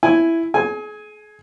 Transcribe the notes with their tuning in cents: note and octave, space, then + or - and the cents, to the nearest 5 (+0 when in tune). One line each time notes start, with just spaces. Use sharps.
E4 +5 G#5 +0
G#4 +35 G#5 +0